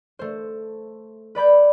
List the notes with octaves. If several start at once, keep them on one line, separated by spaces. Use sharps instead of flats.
A3 C5
B4 D5 B5 G6